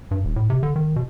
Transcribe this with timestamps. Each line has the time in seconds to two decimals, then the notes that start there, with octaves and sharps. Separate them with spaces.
0.11 G2
0.25 D#1
0.36 A2
0.50 C3
0.63 D3
0.76 D#3
0.96 B2